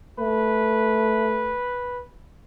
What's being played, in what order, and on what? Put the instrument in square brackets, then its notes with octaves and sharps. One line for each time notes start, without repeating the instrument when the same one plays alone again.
[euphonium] A3 [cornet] B4